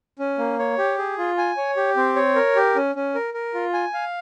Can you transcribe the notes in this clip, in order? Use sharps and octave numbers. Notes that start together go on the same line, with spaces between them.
C#4
A#3
C#5
G4
G#4
F4
G#5
C#5
G4
C4
C#5
A#4
G4
C#4
C#4
A#4
A#4
F4
G#5
F5